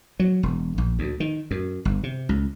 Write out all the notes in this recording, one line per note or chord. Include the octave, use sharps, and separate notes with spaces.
F#3
E1
A#1
D2
D#3
F#2
G1
C3
C#2